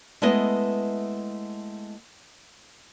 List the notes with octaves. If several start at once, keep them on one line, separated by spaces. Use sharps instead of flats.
G#3 A3 B3 E4 D#5